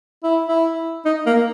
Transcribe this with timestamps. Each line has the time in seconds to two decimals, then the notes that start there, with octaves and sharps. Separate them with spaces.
0.23 E4
0.48 E4
1.05 D#4
1.26 A#3